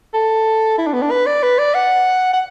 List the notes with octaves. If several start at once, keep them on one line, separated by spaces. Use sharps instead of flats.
A4
E4
D4
B3
D4
B4
D5
B4
D5
F#5
F#5